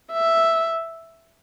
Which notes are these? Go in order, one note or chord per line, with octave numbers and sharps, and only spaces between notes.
E5